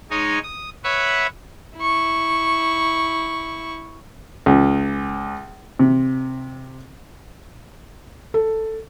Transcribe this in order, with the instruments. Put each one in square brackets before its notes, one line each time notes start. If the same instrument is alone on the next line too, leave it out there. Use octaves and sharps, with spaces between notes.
[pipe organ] G#3 D#4 C#5 D#5 G#5
D#6
B4 C#5 E5 F#5 B5 C#6
[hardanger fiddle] E4 C#6
[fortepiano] C#2
C3
[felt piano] A4